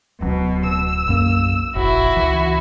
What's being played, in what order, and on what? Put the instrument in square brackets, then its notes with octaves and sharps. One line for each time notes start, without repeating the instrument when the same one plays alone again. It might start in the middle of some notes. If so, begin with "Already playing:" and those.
[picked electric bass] D1 F#3 [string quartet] B2
[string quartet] E6
[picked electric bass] B1 F#2 A#3
[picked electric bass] F1 A#1 [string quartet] E4 F#4
[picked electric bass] C#2 E3